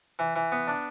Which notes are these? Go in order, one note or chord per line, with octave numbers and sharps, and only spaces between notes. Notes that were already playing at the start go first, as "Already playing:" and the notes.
E3
E3
B3
D4